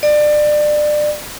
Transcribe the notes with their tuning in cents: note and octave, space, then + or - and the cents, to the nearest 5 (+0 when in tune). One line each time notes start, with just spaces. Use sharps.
D5 +25